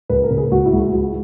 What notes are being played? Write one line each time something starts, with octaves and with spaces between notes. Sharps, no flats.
C#2 B4
A#4
C#3
G#4
C#2 F#4
E4
C#2
F#4
C#2